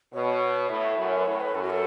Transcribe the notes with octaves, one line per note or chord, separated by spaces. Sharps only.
B2 C#5
A2 E5
F#2
B4
A2 C#5
B4
F#2 A4
F#4
A4